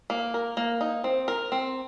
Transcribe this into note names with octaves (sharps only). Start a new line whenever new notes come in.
A#3
A#4
A#3
D#4
C4
A#4
C4